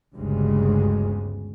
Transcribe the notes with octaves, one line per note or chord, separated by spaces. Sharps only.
G1 D2 G2 C#3 G#3